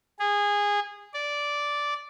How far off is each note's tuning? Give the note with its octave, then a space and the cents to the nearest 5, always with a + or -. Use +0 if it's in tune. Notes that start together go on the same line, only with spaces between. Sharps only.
G#4 -20
D5 -10